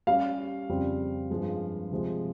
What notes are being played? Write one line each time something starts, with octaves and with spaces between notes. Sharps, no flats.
G3 C#4 G4 F5
F2 C#3 G3 C4
G2 F3 G#3
C3 F3 G#3